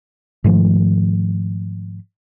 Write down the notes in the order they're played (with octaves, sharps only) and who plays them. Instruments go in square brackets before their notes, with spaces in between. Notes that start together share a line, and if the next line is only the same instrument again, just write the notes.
[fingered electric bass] G#2 D#3 F3 A3